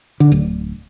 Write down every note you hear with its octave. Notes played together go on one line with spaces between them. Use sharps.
D3
D1